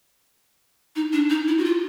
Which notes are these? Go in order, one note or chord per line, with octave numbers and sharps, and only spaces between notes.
D#4
D4
D#4
E4
F#4
F4